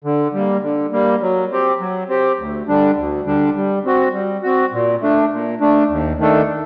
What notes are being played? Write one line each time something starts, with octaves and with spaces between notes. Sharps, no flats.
D3
G3 A#3
D3
G3 A#3
F#3
C4 G4
F#3
C4 G4
D2
D3 G3 D4
D2
D3 G3 D4
G3
C4 F#4
G3
C4 F#4
A#2
A3 D4
A#2
A3 D4
D#2
D#3 A3 D4 A4